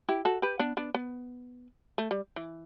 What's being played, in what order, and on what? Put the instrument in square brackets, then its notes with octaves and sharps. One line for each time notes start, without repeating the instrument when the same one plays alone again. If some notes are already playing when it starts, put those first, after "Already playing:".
[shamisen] E4 G4
F#4 A4
G4 B4
B3 D4
B3 D4
B3
A3
G3
E3